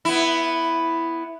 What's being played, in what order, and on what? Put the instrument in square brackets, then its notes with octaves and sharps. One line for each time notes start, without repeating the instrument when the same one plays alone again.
[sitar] B3 E4